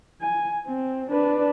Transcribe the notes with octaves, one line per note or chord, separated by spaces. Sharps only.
G#5
C4
D4 B4